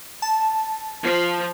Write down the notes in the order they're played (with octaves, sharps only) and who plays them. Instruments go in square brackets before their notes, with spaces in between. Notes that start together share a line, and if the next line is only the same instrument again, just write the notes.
[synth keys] A5
[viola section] F3